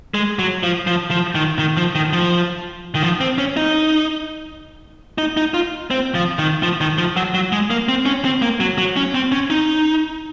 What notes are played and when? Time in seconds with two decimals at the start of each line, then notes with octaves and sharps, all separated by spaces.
0.14 G#3
0.39 F#3
0.63 F3
0.87 F3
1.11 F3
1.35 D#3
1.59 D#3
1.77 F3
1.95 D#3
2.13 F3
2.95 D#3
3.03 F3
3.21 C4
3.38 C#4
3.57 D#4
5.18 D#4
5.37 D#4
5.54 F4
5.91 C4
6.15 F3
6.39 D#3
6.63 F3
6.81 D#3
6.98 F3
7.16 F#3
7.34 F#3
7.52 G#3
7.70 A#3
7.89 C4
8.06 C#4
8.25 C4
8.42 A#3
8.60 F#3
8.78 F#3
8.96 C#4
9.15 C4
9.32 C#4
9.50 D#4